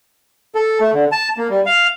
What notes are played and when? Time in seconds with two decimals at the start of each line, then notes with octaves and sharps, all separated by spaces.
0.55 A4
0.80 A3
0.93 D3
1.12 A5
1.37 A#3
1.50 G3
1.66 F5